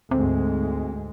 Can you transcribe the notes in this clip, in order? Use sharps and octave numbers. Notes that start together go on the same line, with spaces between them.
D2 G#2 G#3 C4